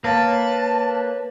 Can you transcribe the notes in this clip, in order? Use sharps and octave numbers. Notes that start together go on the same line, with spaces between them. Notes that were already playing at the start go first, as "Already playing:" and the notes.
A#3 B4 C#5 A5